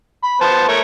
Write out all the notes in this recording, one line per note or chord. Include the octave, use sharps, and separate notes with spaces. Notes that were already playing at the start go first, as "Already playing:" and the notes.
B5
B3 C5 A5
A3 A#4 C#5